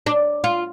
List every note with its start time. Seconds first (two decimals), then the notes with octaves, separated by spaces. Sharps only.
0.06 D4
0.44 F4